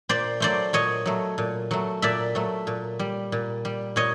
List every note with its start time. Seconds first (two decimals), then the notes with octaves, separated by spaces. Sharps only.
0.09 A#2 C5 D5
0.40 F#3 A3 C5 D5
0.73 A#2 C#5 D#5
1.06 F#3 A3
1.38 A#2
1.71 F#3 A3
2.02 A#2 D5 E5
2.35 F#3 A3
2.67 A#2
2.99 G3
3.32 A#2
3.65 G3
3.96 A#2 C#5 D#5